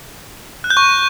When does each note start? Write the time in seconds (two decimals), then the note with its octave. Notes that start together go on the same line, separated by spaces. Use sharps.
0.64 F#6
0.70 G6
0.77 C#6